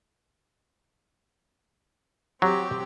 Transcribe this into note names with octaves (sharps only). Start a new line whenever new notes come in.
F#3 C4 G4